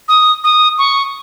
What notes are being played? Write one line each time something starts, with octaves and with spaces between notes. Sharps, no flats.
D#6
D#6
C#6